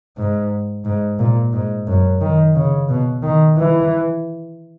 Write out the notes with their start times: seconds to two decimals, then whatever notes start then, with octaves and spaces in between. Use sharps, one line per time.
0.18 G#2
0.85 G#2
1.19 A#2
1.53 G#2
1.87 F#2
2.21 D#3
2.55 C#3
2.89 B2
3.23 D#3
3.57 E3